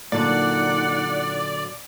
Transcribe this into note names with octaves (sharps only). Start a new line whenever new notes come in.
A#2 D3 F#3 D#4 D5 F#5